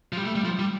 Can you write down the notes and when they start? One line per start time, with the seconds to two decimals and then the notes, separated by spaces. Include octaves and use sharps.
0.12 F3
0.17 G3
0.26 A3
0.35 G3
0.45 F3
0.59 G3